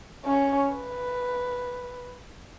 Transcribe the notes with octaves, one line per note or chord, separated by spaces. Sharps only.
C#4 C#5
B4